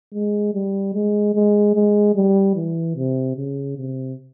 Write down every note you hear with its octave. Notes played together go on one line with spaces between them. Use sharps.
G#3
G3
G#3
G#3
G#3
G3
E3
C3
C#3
C3